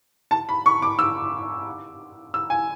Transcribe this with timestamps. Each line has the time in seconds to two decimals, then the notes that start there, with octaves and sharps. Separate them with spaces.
0.31 A5
0.49 B5
0.66 C#6
0.82 D6
0.99 E6
2.34 E6
2.50 G#5